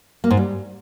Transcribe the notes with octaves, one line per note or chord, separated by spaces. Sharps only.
A#3
G#2
G3